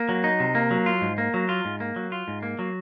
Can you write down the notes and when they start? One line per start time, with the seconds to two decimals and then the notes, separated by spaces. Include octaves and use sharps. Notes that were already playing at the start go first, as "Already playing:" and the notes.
Already playing: A#3
0.09 F#3
0.24 D#4
0.40 C3
0.55 A#3
0.71 F#3
0.86 F4
1.01 G#2
1.18 A#3
1.34 F#3
1.49 F4
1.65 G#2
1.80 A#3
1.96 F#3
2.12 F4
2.28 G#2
2.43 A#3
2.59 F#3